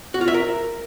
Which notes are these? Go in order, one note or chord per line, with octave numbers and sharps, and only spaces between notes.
F#4
F4
E5
A#4